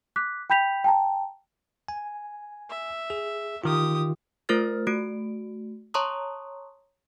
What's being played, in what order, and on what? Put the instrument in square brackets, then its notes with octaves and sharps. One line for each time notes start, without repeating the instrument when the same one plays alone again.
[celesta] D6 F#6 B6
G5 B5 G6 B6 F7
G5 A5 A#5
[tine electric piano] G#5
[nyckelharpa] E5
[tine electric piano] G#4
[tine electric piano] D#3 F4 [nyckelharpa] G4 D#6
[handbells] A3 F4 A#4 C5 F6 A6
A3 F#4 D7
C#5 A5 A#5 C6 C#6 D#6